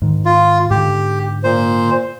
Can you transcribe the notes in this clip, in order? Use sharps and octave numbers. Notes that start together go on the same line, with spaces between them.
G#2 D#3
F4
G#2 D3 G4
A#2 C5